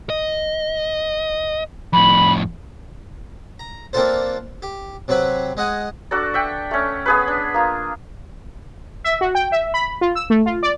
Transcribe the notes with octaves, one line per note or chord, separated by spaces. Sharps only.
D#5
F2 A2 B5
A#5
A#3 C4 D4 F4 A4 C5
G4
C3 F#3 C4 B4 B5
G#3 D#5 F#5 G#5
D4 F#4 A4 D5
E5 F#5 G5
A3 C#4
B3 G#4 B4
D4
A#3 F4
E5
F#4
G5
E5
B5
F4
E6
A3
F4
D5